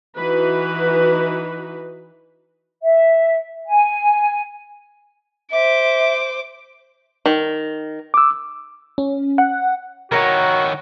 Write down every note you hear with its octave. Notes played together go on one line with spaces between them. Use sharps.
E3 D#4 F#4 B4
E5
G#5
C5 E5 D6
D#3
D6 E6
C#4
F#5
D#3 E4 F#4 A#4 C#5